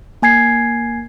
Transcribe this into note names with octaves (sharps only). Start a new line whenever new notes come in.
A#3 G#5 G#6 C7